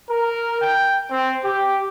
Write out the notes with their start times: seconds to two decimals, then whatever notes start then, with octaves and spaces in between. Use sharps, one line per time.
0.10 A#4
0.62 G5
1.11 C4
1.44 G4